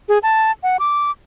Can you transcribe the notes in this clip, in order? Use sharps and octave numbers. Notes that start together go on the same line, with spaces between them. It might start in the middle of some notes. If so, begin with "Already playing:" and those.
G#4
A5
F#5
D6